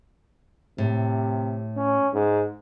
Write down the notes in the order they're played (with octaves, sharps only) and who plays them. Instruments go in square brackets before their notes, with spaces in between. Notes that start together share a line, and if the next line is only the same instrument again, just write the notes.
[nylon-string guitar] A2 [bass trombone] C3
[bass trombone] C#4
G#2